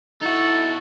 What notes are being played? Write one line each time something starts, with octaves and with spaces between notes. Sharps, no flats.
D#4 E4 F#4 A4